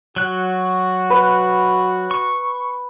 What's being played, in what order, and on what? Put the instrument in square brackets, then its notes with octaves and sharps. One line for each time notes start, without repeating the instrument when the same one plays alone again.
[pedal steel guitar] F#3 F#6 [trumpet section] F#4
[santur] B4
[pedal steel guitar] C#6